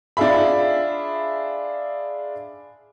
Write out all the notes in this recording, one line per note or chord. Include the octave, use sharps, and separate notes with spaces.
D4 F4 G#4 E5 B5